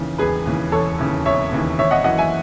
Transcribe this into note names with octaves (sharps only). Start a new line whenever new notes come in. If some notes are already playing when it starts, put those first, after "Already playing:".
Already playing: D#2 C#3 E3
E1 G#4 B4
D#2 C#3 E3
E1 A4 C#5
D#2 C#3 E3
E1 C#5 E5
D#2 C#3 E3
G#1 C#5 E5
D#5 F#5
F#2 E3 D#5 F#5
E5 G#5